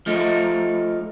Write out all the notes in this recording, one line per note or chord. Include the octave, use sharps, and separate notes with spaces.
F3 A3 D#4